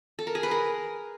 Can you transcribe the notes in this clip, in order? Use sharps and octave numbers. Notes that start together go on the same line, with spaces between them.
A4
A#4
G#4
B4
A#4